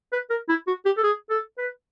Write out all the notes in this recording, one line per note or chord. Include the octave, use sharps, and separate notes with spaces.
B4
A#4
E4
F#4
G4
A4
G#4
A4
B4